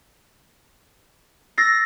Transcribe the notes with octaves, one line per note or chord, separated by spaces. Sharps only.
E6 A6 A#6 C7